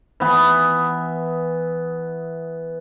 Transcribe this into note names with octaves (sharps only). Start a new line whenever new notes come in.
E3 B3